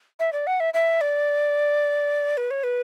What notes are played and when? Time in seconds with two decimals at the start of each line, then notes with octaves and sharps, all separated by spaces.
0.20 E5
0.33 D5
0.47 F#5
0.60 E5
0.74 E5
1.01 D5
2.37 B4
2.51 C#5
2.64 B4